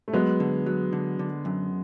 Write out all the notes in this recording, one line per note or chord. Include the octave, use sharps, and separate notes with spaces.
A3
F#3 G#3 B3
D3
F#3
D3
D3
F#2